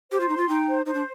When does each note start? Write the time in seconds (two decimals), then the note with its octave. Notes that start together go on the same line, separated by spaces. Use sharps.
0.12 G4 C5
0.20 F4
0.29 D#4 C6
0.37 F4
0.48 D#4 G5
0.67 C5
0.86 D#4 C5
0.94 D4